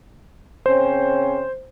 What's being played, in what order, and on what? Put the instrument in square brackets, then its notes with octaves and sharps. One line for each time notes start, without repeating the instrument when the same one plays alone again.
[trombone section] C#3 C4 C#4 [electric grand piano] C5